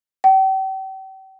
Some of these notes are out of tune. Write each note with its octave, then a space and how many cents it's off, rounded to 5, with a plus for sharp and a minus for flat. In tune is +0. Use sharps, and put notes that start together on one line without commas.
G5 -40